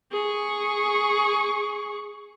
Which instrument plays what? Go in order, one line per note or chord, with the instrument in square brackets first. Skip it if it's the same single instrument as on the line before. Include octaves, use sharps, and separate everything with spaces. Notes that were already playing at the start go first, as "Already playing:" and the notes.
[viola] G#4 C#6